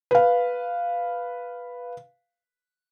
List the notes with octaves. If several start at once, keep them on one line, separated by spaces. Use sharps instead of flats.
B4 F5